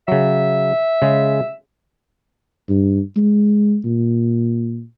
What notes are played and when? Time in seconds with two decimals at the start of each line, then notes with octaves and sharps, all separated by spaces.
0.08 C#3 F#3 E5
1.02 C#3 G#3
2.69 G2
3.16 G#3
3.84 A#2